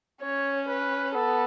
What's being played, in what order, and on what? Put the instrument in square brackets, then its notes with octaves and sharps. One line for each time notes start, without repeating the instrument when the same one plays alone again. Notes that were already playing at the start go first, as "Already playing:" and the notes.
[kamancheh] C#4 [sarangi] C#5
[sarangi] B4
[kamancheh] B3 [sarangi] A4